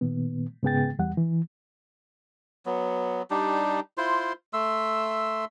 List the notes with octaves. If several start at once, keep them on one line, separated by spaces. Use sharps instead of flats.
A#2 D#3 B3
G#2 C#3 B3 G#4 G5 A6
E2 G3 F#5
E3
F#3 B3
G3 D4 D#4 G4
E4 F4 C5 C6
A3 E5 C6 E6